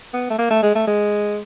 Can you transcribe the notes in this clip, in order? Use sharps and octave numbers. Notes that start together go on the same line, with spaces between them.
B3
A3
A#3
A3
G#3
A3
G#3